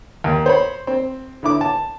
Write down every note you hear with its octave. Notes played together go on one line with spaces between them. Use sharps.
D#2
C5 C#5 B5
C4
D3 E4 D6
A5